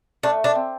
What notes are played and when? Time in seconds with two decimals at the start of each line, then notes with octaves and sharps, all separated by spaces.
0.23 A3 D4
0.44 D4
0.55 C4